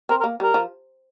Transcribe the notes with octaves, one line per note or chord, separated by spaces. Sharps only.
C4 A#4
A#4
A#3
G3 A#4
F3